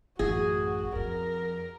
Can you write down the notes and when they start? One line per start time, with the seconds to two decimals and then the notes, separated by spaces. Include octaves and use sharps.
0.19 A1 F#2 F#4 G#4
0.95 F2 A#4